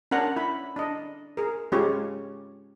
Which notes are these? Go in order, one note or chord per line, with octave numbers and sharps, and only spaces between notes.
C#4 D4 A#4 F#5 A#5
E4 B5
D4 D#5
G#4 A#4
G#3 C#4 F4 G4 C#5